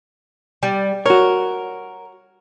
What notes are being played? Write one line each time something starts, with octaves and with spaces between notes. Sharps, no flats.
G3
F#4 A#4 C#5